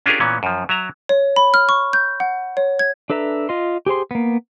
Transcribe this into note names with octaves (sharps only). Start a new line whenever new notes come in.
C#4 D4 F4 G4 G#4 A#4
A#2 E3 B3 C#4
F#2 F3
F#3 E5 A#5
C#5
B5
F6
C#6
G6
F#5
C#5
G#6
D4 A4 B4 E5 A#5
F4 D#5 C6
G4 G#4 C5 C6
A#3 B3